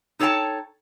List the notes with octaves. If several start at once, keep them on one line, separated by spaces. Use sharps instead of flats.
D#4 A4 C#5 D#5 G5 A5